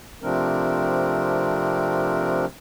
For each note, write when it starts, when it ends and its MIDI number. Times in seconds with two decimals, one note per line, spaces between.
0.23 2.45 48
0.23 2.45 53
0.23 2.45 57
0.23 2.45 60
0.23 2.45 62
0.23 2.45 70